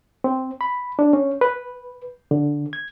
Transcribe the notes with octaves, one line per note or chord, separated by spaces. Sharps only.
C4
B5
D4
C#4
B4
D3
G#6